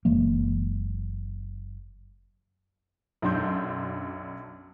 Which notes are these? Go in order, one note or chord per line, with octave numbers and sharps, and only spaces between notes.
F#1 E3 G#3 A#3
B1 F#2 D4 C6 G6